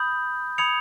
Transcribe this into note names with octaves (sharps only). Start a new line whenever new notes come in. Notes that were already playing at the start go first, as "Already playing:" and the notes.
Already playing: B5 D#6 G6
B5 D#6 G#6 C#7 F7